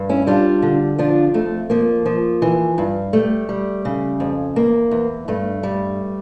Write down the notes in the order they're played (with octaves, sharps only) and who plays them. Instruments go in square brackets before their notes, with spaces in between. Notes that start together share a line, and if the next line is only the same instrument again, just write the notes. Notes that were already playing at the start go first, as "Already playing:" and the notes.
Already playing: [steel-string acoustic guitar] G2
C#4 E4
G3 D4 F4
D3
F3 D4 F4
F2 A3
F3 A#3
F3
E3
G2
G3 A3
G3
C#3
F2
E2 A#3
E2
G2 A3
G3